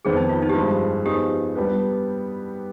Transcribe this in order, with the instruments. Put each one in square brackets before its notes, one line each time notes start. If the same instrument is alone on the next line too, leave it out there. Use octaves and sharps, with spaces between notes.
[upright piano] F2 D#3 B3 [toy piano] G#4
[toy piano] D#4
F4
D#4
G4
[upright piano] G2 F3 G#3 [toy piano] F4
[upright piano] F3 B3 D#4 G#4 [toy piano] G4
[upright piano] G3 B3 D4 G4 B4